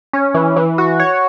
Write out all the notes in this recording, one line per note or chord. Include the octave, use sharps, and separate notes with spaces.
C#4
E3
E3
F#4
C#5